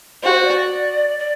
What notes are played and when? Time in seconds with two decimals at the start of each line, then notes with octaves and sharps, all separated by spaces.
0.23 F#4 C5
0.33 C5
0.44 D5
1.19 D5